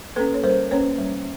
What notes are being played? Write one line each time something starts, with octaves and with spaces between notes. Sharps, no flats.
A#3 C#4 A4 B4
C#5
G3 A#4 C5
A#3 C#4 B4 C#5
G3